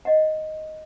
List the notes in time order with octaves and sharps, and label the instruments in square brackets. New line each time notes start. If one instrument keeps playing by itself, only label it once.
[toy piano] D#5 F#5